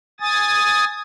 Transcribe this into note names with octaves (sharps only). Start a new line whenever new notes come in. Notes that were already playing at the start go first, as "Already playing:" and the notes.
G#5 D#6 A6